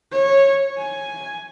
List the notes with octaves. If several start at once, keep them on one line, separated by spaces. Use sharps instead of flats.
C#5
G#5